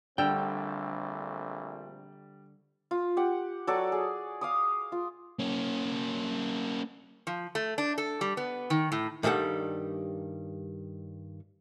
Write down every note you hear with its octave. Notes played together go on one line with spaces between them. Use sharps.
A#1 D3 G3 A3 C4 G5 E6
F4
G4 F#5
F#3 A4 D5 C#6
G#4
F5 D6 D#6
F4
A#3 C#4
F3
A3
D4
A4
G3
B3
D#3
A2
G2 D#3 G3 A4 F#5